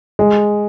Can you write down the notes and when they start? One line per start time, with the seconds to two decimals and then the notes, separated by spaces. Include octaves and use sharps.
0.19 G#3